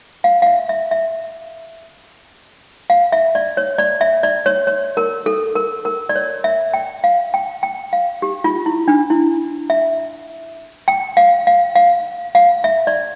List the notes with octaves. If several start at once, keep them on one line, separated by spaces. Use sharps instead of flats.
F5
F5
E5
E5
E5
F5
E5
D5
C#5
D5
E5
D5
C#5
C#5
A#4
A4
A#4
A#4
D5
C#5
E5
G5
F5
G5
G5
F5
G4
F4
E4
D4
E4
E5
G5
F5
F5
F5
F5
E5
D5